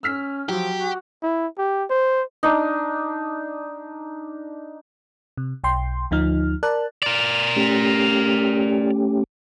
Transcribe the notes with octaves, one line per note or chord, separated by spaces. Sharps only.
C#4 E6 F6 B6
F3 F#3 G4
F#4
E4
G4
C5
D4 D#4
C3
B1 G5 C6
D2 F3 D#4 F6
A#4 D5 A5 F#6
A#4 D5
A3 C#4 G4